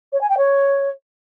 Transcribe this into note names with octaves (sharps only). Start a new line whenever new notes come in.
C#5
G#5
G5
C#5